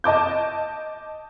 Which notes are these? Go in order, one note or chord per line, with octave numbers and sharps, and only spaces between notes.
D#5 A5 D6 G6